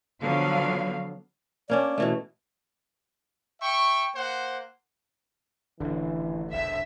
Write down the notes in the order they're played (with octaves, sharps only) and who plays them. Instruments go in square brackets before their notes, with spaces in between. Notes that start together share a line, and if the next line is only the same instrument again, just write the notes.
[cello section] D3 F3 F#3 B3 F5
[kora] A#3 C#4 D4 [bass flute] D5
[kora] B2 E3 A3
[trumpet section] E5 G5 C#6
A#3 C5 F#5
[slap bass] D#1 A1 [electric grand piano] D3 [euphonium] E3
[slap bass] E1 A#1 A#2 [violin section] E5